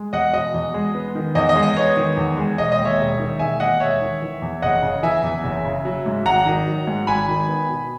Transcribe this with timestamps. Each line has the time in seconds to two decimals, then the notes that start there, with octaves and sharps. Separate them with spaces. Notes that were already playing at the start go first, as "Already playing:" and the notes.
Already playing: G#3
0.13 E2 D#5 F#5
0.33 B2 D#5
0.54 E2
0.74 G#3
0.95 B3
1.15 D#3
1.35 E2 D#5
1.49 D#5
1.56 G#3
1.63 D#5
1.77 B3 C#5
1.97 D#3
2.17 E2
2.37 G#3
2.58 E1 D#5
2.72 D#5
2.79 D#2
2.85 C#5 E5
2.99 E1
3.19 D#3
3.39 E1 E5 G#5
3.60 D#2 D#5 F#5
3.80 E1 C#5 E5
4.01 D#3
4.22 E3
4.42 E2
4.62 F#1 D#5 F#5
4.82 C#3
5.03 E3 E5 G#5
5.23 E2
5.44 F#1
5.65 C#3
5.85 F#3
6.06 G#2
6.26 G#1 F#5 A#5
6.46 D#3
6.67 F#3
6.87 G#2
7.07 G#1 G#5 B5
7.28 D#3
7.49 B3
7.69 B2